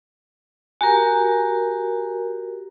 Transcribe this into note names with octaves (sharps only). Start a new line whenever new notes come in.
F#4 G4 A#4 G#5 A#5